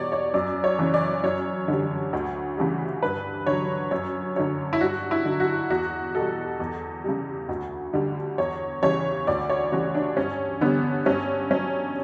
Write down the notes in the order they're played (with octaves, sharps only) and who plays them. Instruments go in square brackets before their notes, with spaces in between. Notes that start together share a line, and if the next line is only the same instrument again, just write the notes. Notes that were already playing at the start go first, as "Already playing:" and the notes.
Already playing: [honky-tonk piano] E2 B2 G3 C#5 D5
C#5
F#2 D5
C#5
C#3 E3
D5
F#2 C#5
D3 G3
D2
C#3 E3 G3
G2 B4
D3 F#3 C#5
F#2 C#5
D3 F#3 C#5
E4
G2 F#4
E4
D3 F#3
F#4
E2 F#4
B2 G3 A4
E2
C#3 G3
D2
D3 G3
E2 C#5
C#3 E3 G3 C#5
D2 D5
C#5
C#3 E3 G3 F#4
D4
G2 C#4
D3 G3 B3
G2 C#4
F#3 C#4